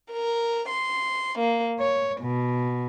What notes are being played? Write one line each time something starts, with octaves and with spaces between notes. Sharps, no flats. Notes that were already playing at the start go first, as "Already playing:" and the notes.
A#4
C6
A#3
C#5
B2